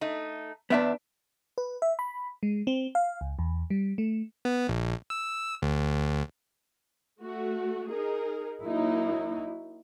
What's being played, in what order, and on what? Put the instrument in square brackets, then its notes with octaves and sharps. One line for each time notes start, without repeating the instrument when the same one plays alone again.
[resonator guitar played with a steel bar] A3 D#4
[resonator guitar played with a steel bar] E2 E5 [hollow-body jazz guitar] B3 D4
[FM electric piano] B4
E5
B5
G#3
C4
F5
C#2
E2
G3
A3
[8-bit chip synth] B3
A#1
E6
D2
[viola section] A3 F#4
D#4 G#4 A#4
[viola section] F#3 A#3 D#4 [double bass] E4